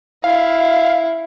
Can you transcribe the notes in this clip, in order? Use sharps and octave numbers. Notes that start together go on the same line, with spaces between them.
E4 F5